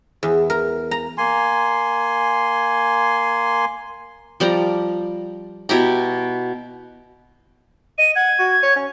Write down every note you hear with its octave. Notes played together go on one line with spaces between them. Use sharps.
E2
A#4
A#5
A#3 G#5 C6
F3 G3 D5 A#5
B2 E4 G4 A#5
D#5 D#7
F#5 G#6
F#4
C#5
C#4